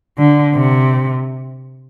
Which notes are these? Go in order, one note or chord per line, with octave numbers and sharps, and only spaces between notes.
D3
C3